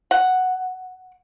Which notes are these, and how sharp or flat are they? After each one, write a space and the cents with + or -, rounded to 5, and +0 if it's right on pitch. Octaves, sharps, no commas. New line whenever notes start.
F#5 +0